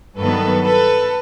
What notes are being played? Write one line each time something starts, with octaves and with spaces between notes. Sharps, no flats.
G2 D#3 F#3 B3 A4 B4
A4 B4